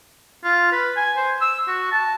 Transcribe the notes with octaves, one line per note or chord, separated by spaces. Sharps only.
F4
B4
G#5
C5
E6
F#4
A5